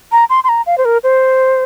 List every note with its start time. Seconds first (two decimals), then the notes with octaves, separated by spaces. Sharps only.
0.12 A#5
0.30 C6
0.44 C6
0.49 A#5
0.66 F5
0.78 C5
0.85 A#4
1.04 C5